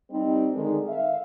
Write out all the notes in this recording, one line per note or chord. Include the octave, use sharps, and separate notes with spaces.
G3 C4 D#4
D3 D#3 G#3
E5 F5